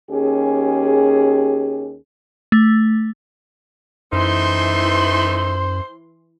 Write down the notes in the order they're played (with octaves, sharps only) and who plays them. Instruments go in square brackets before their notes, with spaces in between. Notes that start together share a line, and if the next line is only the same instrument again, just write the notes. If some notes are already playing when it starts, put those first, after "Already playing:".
[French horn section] D#2 C#4 G4 G#4
[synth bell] A3
[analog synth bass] F#2 [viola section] E3 C6 [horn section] A3 D#4 E5 [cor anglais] C5